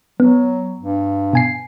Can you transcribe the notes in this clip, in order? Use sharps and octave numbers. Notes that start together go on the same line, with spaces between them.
F#3 B3
G2
B2 G#5 C7